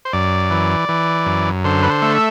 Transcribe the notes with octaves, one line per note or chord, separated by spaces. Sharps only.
C5
F#2 D5
E3
E3
F#2
D3 C5
B4
C5
A3
E5